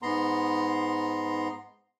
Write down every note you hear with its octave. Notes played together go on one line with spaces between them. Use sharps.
G#2 B3 A#5 C6